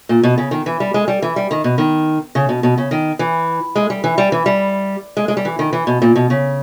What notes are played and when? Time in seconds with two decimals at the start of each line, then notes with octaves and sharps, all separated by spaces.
0.09 A#2
0.23 B2
0.38 C#3
0.51 D#3
0.66 E3
0.80 G3
0.94 G#3
1.08 G3
1.22 E3
1.36 G3
1.51 D#3
1.64 B2
1.78 D#3
2.35 C#3
2.49 B2
2.63 B2
2.78 C#3
2.91 D#3
3.19 E3
3.76 G#3
3.90 G3
4.04 E3
4.18 G3
4.32 E3
4.46 G3
5.17 G#3
5.28 G#3
5.37 G3
5.45 E3
5.59 D#3
5.73 E3
5.87 B2
6.02 A#2
6.16 B2
6.30 C#3